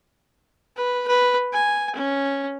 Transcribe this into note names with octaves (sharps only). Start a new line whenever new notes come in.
B4
B4
G#5
C#4